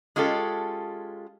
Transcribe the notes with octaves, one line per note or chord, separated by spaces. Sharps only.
G#3 C#4 F4 G4 A4